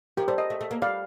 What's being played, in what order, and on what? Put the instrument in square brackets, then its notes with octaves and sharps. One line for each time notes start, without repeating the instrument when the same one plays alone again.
[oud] F3 [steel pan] G4 A#4
[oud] G3 [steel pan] A4 C5
[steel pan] C5 D#5
[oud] A3
A3
A#3
[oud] G3 [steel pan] D5 F5